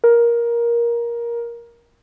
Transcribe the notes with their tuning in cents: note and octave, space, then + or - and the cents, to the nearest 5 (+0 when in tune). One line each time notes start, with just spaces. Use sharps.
A#4 +15